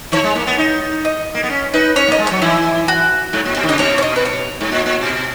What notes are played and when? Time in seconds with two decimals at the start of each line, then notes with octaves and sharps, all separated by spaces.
0.12 D#3 C#5
0.24 G#3
0.35 A#3
0.47 B3
0.58 D#4
1.05 D#5
1.35 A#3
1.43 B3
1.50 C#4
1.74 D#4 B4
1.96 C#4 C#5
2.08 A#3
2.12 D#5
2.19 G#3
2.27 F#3 C#5
2.42 E3 E4
2.88 F#4
3.33 G#2
3.45 A#2
3.56 B2
3.63 D#3
3.68 C#3 D#5
3.79 B2 C#5
3.98 C#5
4.03 D#5
4.16 B4
4.25 C#5
4.61 G#2
4.72 A#2
4.86 A#2
5.01 B2